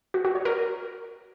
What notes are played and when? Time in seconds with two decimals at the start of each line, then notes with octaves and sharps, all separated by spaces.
0.14 F#4
0.25 F#4
0.35 C#5
0.45 A#4